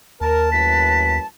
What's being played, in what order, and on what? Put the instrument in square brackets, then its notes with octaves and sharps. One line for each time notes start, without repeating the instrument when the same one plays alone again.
[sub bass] D#2 [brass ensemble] A#4 [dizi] A5
[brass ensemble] F#2 A2 B4 [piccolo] B6